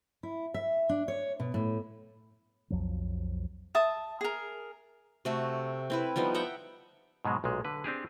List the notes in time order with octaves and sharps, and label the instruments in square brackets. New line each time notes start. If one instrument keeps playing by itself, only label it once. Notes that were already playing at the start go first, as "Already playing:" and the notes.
[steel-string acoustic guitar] E4
E5
D4
C#5
B2
A2
[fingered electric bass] B1 F2 F3 F#3
[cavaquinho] E5 A5 D#6
G#4 A#4
[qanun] C3 A3 F#4
C4 E4 B4
F3 G3 B3 D#4
E5 F#5 G5 A#5
[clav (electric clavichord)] G#2 B2 F#3 G#3
B1 A#2 G#3
D3 B4
C4 D4 G4 G#4